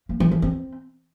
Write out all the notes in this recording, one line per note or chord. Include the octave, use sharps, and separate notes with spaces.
A#3
E3
E3
C4